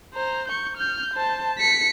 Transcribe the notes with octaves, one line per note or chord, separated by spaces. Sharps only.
C5 A#5
C#6 G6
F6 G6
C5 A5
B6 C#7